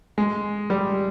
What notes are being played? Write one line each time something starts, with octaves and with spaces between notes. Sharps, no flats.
G#3
G3